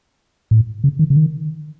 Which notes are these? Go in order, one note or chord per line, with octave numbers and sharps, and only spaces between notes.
A2
C#3
D#3
C#3
D#3